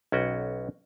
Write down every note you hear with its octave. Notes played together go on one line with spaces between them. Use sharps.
B1 C#4 F#4 G5